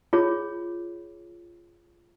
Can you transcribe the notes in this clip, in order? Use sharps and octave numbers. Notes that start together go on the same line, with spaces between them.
F4 G#4 C#5